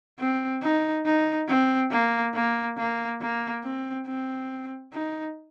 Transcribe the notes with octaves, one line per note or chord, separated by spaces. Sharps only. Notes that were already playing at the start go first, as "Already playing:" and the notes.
C4
D#4
D#4
C4
A#3
A#3
A#3
A#3
C4
C4
D#4